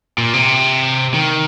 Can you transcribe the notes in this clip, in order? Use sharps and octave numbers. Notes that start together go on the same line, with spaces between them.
A#2
C3
D#3